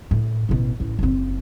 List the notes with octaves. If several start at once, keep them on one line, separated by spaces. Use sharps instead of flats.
A2
A1 B2
A1
F#1 C4